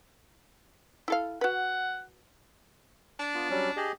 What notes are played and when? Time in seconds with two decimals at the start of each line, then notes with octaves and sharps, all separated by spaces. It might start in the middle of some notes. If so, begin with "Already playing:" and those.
1.08 E4 A4 F5
1.41 F#4 B4 F#5
3.19 D4
3.34 B3 F4
3.50 F#3 G3 C#4
3.77 G4 G#4 D#5